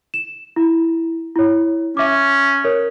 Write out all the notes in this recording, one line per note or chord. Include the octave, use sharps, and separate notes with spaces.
E7
E4
E4 C#5
C#4 E5 D6
A#4 C#5